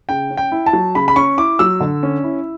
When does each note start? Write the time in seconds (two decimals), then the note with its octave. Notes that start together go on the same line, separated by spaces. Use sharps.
0.09 C#3 G5
0.30 C#4
0.37 G5
0.52 E4
0.66 A5
0.73 F#3
0.95 C#3 B5
1.08 B5
1.16 C#4 C#6
1.38 E4 D6
1.59 F#3 E6
1.80 D3
2.03 C#4
2.24 E4